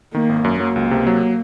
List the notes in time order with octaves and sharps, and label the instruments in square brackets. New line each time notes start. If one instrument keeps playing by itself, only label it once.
[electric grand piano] D#3 [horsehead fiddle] A#3
[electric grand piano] G#1
F#2
[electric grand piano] F#3 [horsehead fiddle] A#3
[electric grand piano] C#2
C3
F#3